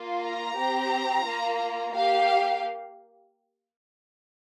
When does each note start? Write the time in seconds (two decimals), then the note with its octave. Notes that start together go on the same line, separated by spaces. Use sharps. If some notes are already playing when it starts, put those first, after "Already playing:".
Already playing: A#3 F4
0.23 A#5
0.57 C4 G4
1.26 A#3 F4
1.94 A#3 G4 F5